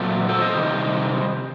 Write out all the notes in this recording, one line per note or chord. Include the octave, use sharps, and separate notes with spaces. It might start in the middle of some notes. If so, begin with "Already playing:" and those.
Already playing: A#2 F#3 A3 C4
A4 C5
C5 D#5
C3 D#3 G3